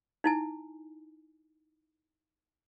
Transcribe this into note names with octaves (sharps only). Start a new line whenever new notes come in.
D#4 E4 G#5